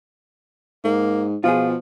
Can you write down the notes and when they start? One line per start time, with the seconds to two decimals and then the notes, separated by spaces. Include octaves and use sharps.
0.84 G#2 A#3
1.44 B2 F3 F4 G#4